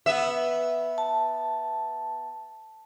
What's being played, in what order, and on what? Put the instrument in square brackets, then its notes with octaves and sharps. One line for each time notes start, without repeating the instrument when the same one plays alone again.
[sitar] B3 E5
[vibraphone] A5